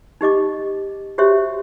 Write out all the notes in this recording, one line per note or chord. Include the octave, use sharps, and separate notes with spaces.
D#4 G4 D#5 D6
F#4 G4 C5 C#5 E5